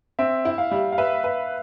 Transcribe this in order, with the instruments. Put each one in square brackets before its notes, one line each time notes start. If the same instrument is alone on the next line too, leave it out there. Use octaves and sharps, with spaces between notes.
[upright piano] C4 [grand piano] E5
[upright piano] E4
[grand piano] F5
[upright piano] G3
[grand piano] F5
[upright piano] B4 [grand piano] E5
[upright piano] B4